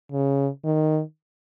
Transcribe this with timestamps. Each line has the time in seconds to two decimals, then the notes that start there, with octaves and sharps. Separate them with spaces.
0.12 C#3
0.64 D#3